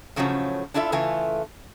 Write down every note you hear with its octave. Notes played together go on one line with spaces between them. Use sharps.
A2 C#3 F3 F#3 B3 C#4
D4 E4 F4 A4 E5
C#3 E3 A3 F4 G#5